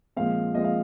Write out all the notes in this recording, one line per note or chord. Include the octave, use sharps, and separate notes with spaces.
A#2 F3 G#3 C4 F5
A#2 F3 G#3 C4 D#5
F5